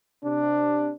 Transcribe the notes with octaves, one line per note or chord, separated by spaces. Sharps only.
C3 D4